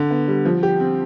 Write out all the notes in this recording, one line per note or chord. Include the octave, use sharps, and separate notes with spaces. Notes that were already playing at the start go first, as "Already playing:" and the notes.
Already playing: D3
B3
G3
F3
G4
C4